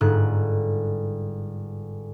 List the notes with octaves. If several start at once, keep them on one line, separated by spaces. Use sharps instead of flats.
G1 G#2 F#6